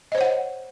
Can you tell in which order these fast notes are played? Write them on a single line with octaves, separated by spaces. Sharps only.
D#5 C5 C#5 F#5